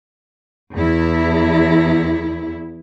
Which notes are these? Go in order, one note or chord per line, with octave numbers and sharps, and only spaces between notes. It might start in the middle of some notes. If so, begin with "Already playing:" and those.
E2 E4